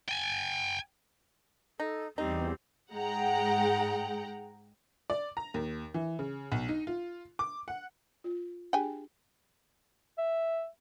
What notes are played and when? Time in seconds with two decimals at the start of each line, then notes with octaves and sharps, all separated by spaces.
0.09 G5 G#5
1.80 D#4 A4
2.18 E2 G3 C4 D#4 G4
2.94 G#2 G#3 F#5 G5 A#5
5.10 D5
5.37 A#5
5.54 D#2
5.94 E3
6.19 C#3
6.52 B1
6.68 D#4
6.87 F4
7.39 D6
7.68 F#5
8.24 F4
8.73 D4 G4 G#4 G5 G#5
10.18 E5